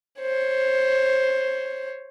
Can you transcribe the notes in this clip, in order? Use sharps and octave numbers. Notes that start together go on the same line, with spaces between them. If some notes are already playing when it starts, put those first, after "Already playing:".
C5 C#5